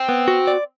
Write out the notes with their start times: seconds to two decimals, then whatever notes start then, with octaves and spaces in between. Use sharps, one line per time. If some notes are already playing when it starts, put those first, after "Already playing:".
Already playing: C4
0.09 B3
0.28 F#4
0.47 D5